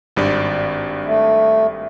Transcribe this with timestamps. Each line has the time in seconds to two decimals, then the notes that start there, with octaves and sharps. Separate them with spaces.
0.17 G#1 G2 D5
1.05 A3